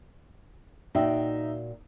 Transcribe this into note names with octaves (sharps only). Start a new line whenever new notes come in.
A#2 D#4 F#4 E5 G5